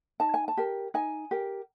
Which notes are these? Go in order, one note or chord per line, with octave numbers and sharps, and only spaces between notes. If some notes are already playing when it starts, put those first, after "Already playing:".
D#4 A5
G#5
A5
G4 A#4
D#4 G#5
G4 A#4